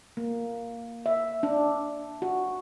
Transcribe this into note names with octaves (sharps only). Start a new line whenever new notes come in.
A#3
E5
D4
F#4